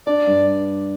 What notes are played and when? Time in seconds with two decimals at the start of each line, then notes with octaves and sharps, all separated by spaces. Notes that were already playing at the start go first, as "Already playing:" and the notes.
0.07 D4 D5
0.27 G2